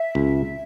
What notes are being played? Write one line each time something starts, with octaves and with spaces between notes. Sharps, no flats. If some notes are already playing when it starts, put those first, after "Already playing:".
Already playing: E5
C#2